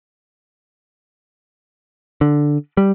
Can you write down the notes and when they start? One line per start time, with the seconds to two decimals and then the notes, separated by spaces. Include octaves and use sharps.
2.21 D3
2.77 G3